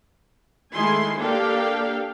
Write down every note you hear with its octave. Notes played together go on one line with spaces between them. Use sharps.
D#3 G#3 A3 E4 G#5 C6
A#3 D4 G4 A4 F5 G5